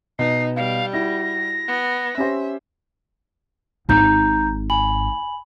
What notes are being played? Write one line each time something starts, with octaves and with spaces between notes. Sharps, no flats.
B2 D#4 C7
G3 F5
E4 F#4 A#6
B3
C#4 G4 C5 E5
G#1 D#4 A#5 G6
G#5 B5 F#7